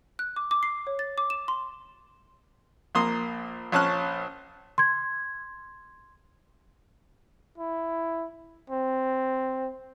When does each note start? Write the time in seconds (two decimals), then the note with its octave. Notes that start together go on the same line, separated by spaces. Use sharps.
0.19 F#6
0.36 D6
0.51 D6
0.63 C7
0.87 C#5
0.99 A6
1.18 D6
1.30 E7
1.48 C6
2.95 A#1 A#3 C6 D#6
3.72 A#1 C#4 A5 F6 F#6
4.78 C6 G#6
7.58 E4
8.70 C4